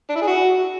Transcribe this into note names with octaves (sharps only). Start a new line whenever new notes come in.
D4
E4
G#4
F#4